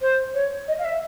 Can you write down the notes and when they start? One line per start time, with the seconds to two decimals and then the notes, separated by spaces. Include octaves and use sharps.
0.01 C5
0.34 C#5
0.68 D#5
0.78 F5
0.84 E5